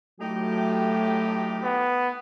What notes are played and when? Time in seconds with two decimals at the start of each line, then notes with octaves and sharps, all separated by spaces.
0.20 A2 F#3 A3 D#4 G4
1.64 B3